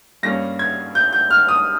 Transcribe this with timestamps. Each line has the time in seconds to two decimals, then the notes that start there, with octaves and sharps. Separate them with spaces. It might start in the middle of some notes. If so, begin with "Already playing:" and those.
0.23 G2 G3 A#3 C#4 A#6
0.59 G#6
0.95 G6
1.13 G6
1.31 F6
1.49 D#6